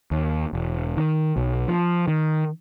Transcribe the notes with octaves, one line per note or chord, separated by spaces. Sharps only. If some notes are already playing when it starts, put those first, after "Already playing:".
D#2
E1
D#3
B1
F3
D#3